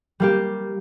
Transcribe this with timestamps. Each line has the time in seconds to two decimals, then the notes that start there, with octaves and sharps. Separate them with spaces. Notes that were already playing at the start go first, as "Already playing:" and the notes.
0.20 G3 A#3 G4